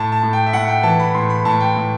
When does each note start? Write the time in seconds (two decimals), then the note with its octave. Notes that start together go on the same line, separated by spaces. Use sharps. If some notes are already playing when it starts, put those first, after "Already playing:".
Already playing: A2 A5
0.12 A5
0.23 A2
0.33 G5
0.46 E5
0.53 A2 F#5
0.68 G5
0.83 E3 A5
0.99 B5
1.14 A2 C6
1.30 B5
1.45 A2 A5
1.61 G5
1.76 A2